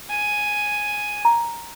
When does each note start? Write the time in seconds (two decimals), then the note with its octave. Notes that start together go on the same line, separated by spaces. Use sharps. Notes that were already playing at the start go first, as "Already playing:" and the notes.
0.10 G#5
1.25 A#5